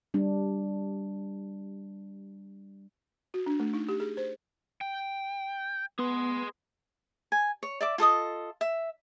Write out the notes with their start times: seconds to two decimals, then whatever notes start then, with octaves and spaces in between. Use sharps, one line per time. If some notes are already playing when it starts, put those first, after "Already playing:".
0.14 G3 D4
3.34 F#4
3.46 D4
3.60 A3
3.73 D#4
3.89 G4
4.00 G#4
4.17 C5
4.81 G5
5.99 B3 G#4 C6
7.32 G#5
7.63 C#5
7.81 D5 E5 D6
7.98 F4 A4 D#5 D#6
8.61 E5